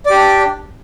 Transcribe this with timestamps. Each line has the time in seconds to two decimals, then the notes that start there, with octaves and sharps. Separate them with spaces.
0.06 D5
0.10 G4
0.15 D4